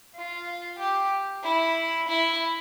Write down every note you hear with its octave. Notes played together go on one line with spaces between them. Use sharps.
F4
G4
E4
E4